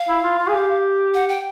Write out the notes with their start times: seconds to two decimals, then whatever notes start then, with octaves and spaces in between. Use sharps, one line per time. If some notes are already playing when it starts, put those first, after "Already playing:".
Already playing: F5
0.09 E4
0.24 F4
0.38 F4
0.48 G#4
0.54 G4
1.14 F#5
1.29 G5